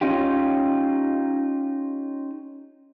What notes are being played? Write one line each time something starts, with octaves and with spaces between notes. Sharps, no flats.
C#4 D#4 F4 G4